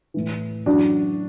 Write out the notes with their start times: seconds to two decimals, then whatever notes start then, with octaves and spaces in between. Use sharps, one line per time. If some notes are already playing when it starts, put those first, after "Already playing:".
0.14 A2 E3
0.66 F#2 E3 D4 F#4